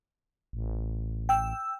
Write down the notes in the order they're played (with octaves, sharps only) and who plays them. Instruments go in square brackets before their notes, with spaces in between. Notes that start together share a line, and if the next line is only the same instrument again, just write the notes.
[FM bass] A1
[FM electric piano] G5 E6